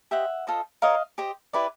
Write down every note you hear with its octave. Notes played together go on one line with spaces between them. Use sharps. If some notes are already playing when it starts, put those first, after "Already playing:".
G4 C5 D#5 E5 F#5
F4 A4 C5 D#5
F4 A#4 C#5 D#5 F5
G4 C5 D#5
E4 G4 B4 D5